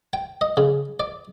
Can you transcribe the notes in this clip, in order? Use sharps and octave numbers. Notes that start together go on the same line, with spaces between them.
G5
D#5
C#3
D5